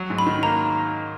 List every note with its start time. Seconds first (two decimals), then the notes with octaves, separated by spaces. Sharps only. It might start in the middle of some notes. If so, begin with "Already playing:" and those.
Already playing: F#3
0.10 G#2
0.18 B5
0.27 D#3
0.43 A#3 A#5